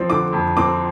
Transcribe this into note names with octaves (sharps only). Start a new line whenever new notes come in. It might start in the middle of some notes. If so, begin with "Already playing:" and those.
Already playing: F3 C4
D3 D6
F2
C4 D6